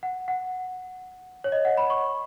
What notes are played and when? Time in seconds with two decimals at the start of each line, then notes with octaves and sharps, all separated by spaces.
0.03 F#5
0.28 F#5
1.44 C#5
1.52 D#5
1.65 F#5
1.77 B5
1.90 C#6